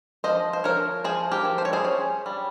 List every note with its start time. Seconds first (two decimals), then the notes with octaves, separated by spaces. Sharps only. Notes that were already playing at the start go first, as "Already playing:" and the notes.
0.24 F3 C5 D#5
0.53 C5
0.64 F3 A#4 C#5
1.04 F3 G#4 C5
1.32 G4 A#4
1.45 F3
1.58 C5
1.65 C#5
1.73 G#4 C5
1.85 C#4
2.26 G3